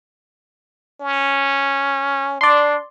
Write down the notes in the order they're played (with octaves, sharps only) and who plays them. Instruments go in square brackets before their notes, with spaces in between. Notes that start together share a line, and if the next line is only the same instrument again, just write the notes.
[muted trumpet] C#4
[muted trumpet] D4 [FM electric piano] D5 C6